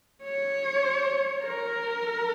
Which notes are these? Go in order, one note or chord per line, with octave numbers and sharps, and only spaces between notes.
C#5
A#4